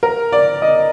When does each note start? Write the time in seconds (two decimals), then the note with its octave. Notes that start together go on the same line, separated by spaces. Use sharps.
0.03 A#4
0.32 D5
0.62 D#5